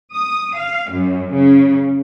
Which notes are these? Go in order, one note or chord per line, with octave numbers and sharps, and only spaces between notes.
D#6
F5
F#2
C#3